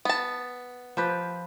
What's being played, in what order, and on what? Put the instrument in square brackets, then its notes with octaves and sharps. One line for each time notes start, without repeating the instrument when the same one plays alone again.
[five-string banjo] B3 A5
[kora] F3 G4 B4